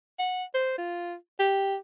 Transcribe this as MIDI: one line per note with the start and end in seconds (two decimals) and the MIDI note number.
0.19 0.44 78
0.54 0.76 72
0.78 1.15 65
1.40 1.76 67